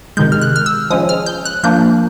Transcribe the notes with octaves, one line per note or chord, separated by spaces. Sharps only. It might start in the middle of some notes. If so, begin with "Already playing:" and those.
C3 D#3 G#3 G6
F6
F#6
F6
E6
F3 G#3 C#4 D#6
F6
G6
F#6
F3 A#3 D4 G6